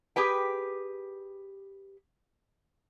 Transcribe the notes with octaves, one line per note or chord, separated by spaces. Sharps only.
G4 G#4 B4 G5